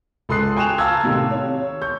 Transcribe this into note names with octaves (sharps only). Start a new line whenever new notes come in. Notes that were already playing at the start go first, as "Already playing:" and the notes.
C#2 A4 C6 D#6 F#6 C7
G5 G#5 C#6 F#6 E7 F7
F5 A5 A#5 E6 G#6
A2 C3 D#3
C#5
C#6 G6